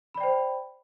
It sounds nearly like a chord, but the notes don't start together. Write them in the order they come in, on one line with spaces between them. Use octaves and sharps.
B5 D5 G5 C5